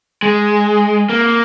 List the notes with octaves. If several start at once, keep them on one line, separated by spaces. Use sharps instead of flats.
G#3
A#3